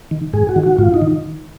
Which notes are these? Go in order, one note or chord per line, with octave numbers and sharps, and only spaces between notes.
D#3
G#2 G#4
F#4
D#3
F#4
G#2 F4
D#4
D#3